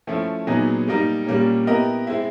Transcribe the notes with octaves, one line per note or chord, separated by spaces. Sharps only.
F3 A3 C#4 E4
A#2 F#3 B3 D#4 G#4
G3 A#3 D#4
A#2 G3 A#3 C#4
B3 E4 G4 A#4 D#5
G#3 C4 E4